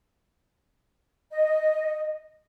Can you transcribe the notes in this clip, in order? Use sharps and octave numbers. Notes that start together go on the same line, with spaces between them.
D#5